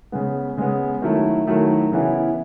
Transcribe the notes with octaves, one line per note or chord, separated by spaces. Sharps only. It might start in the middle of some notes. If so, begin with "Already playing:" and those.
C#3 G#3 B3
C#3 G#3 B3
D#3 F#3 A3 E4
D#3 F#3 A3 E4
C#3 E3 B3 E4